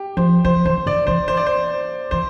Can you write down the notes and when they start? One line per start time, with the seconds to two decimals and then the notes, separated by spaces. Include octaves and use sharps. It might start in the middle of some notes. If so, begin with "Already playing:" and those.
Already playing: G4
0.17 F3 C5
0.45 F3 C5
0.65 E3 C5
0.86 D3 D5
1.07 E3 C5
1.28 C5
1.37 D5
1.47 C5
2.11 E3 C5